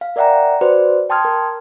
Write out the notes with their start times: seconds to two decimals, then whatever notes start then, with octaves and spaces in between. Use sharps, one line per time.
0.01 F5
0.16 A#4 D5 E5 F#5 G5 A#5
0.61 F#4 B4 C5 D5
1.10 G5 A5 C6 D#6 F6 G#6
1.25 A#4